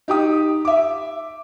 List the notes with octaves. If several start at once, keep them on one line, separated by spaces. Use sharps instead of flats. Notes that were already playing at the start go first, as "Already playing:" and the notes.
D#4 G4 G5 D#6
E5 D6